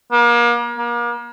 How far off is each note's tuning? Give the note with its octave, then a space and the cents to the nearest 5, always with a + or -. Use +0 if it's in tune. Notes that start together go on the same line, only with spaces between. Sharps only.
A#3 +35
A#3 +35